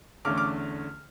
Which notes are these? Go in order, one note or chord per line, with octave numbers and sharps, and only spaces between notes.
E2 D3 A3 C#4 D6 F6
D6 F6